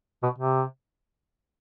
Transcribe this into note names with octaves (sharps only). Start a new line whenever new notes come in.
B2
C3